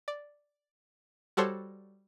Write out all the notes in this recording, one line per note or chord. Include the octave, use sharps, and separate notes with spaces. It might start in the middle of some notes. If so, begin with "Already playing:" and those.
D5
G3 F#4 G4 A4 C5 C#5